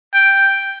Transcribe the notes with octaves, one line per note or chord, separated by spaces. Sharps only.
G5